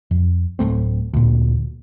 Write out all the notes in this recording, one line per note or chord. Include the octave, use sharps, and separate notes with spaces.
F2
D1 E2 A3 C4
D2 A#2